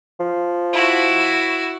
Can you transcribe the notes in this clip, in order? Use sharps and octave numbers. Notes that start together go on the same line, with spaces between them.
F3
E4 F#4